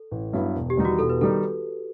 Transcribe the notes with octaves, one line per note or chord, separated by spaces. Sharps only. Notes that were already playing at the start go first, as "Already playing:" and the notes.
Already playing: A4
A1
G2 F#3 B3 E4
E1
G4
E2 D#3 G3 D#4
F#4
E1 A4
B4
D#3 G3 D#4 A4